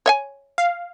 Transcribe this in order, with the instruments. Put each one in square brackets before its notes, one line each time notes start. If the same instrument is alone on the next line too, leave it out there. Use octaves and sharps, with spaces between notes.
[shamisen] C#5 E5 G#5
[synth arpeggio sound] F5